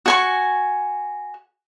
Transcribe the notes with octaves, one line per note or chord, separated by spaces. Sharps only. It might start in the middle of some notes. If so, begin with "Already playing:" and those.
F#4 G#5 C#6